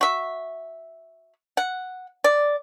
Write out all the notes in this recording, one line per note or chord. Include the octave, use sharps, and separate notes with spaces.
F#4 E5
F#5
D5